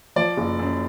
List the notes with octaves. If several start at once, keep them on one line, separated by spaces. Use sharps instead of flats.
F3 D5
F#1
F#2